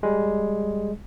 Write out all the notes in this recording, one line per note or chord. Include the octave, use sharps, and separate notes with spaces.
G3 G#3